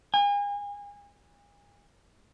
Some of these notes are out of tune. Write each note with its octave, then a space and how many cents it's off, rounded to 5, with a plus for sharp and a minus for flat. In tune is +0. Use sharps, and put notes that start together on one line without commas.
G#5 -35